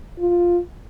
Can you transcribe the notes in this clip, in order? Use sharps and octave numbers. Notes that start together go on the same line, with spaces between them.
F4